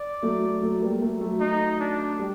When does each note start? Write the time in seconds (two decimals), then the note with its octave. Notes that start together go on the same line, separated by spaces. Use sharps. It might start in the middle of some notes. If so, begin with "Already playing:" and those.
Already playing: D5
0.23 F#3 A3
0.62 F#3 A3
0.82 G3 A#3
1.01 F#3 A3
1.21 F#3 A3
1.40 D#4
1.80 D4
2.19 G3